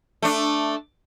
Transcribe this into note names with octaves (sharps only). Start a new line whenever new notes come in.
A3 D4